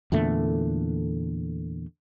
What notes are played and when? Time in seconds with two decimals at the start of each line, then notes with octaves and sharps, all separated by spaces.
0.12 E2 A#2 D3 A3